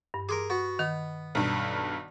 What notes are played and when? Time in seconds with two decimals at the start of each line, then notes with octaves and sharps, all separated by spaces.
0.14 G2
0.29 G#4 A#4 C6 D6
0.50 B3 F#4
0.79 D#3 B3
1.35 B1 G2